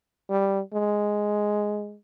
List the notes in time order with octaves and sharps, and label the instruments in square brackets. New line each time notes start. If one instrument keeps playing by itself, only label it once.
[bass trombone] G3
G#3